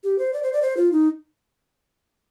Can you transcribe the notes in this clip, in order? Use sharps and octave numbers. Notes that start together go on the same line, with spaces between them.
G4
C5
D5
C5
D5
C5
F4
D#4